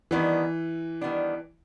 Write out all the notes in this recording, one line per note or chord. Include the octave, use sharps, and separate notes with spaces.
D#3 E3 G3 B3 D4
D#3 G3 B3 D4